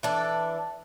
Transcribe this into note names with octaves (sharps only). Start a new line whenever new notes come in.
E3 D4 A4